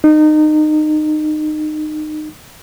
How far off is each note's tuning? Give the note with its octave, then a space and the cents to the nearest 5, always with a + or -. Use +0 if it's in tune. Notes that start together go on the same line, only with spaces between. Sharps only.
D#4 -25